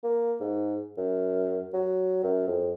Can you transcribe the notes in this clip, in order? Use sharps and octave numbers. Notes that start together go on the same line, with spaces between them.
A#3
G#2
F#2
F#3
F#2
F2